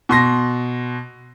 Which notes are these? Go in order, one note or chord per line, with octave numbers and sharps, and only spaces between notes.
B2 C6 A#6